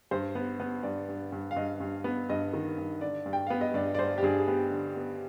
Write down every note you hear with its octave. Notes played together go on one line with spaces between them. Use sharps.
G2 C5
B3
B3
G2 D5
G2
G2
F5
G2 D#5
G2
B3
G2 D#5
D#3
G2
D3 D5
G2
G5
B3 F5
D#5
G2 D5
D5
G2 C5
G4
G2 G#4
G#4
B3 G4
D3
B3